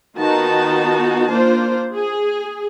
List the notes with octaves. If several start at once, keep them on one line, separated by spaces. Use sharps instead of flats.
D#3 B3 D#4 F4 F#4 A5
A#3 D4 F4 C5
G#4